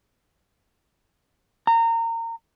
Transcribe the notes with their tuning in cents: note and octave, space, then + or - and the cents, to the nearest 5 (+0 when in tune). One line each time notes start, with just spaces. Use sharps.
A#5 -25